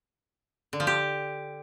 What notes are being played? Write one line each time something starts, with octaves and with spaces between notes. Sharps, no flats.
D3
F3
G4